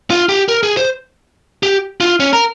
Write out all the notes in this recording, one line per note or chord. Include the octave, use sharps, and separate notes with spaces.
F4
G4
A#4
G#4
C5
G4
F4
C#4
A#4